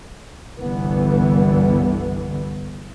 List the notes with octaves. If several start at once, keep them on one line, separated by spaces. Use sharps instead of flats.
G1 C2 D3 E3 G3 B3